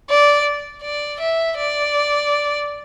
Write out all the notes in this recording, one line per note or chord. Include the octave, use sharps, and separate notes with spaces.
D5
D5
E5
D5